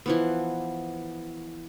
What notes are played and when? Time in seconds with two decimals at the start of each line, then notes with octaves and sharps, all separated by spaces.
0.06 E3 F3 B3